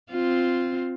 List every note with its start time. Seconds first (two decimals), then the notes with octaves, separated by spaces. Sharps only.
0.11 C4 F4